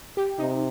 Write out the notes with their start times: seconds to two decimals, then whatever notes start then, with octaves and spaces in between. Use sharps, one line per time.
0.17 G4
0.39 C3 D#4